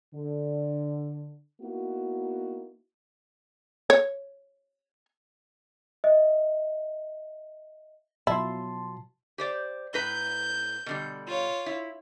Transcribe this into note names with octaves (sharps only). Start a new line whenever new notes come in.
D3
A#3 B3 D#4 E4 F#4
C#5
D#5 E5
B2 F#3 E4 F4 A5 C6
G4 C5 D5
A2 B4 A#5 G6
B2 D3 G3
F4 C#5
E4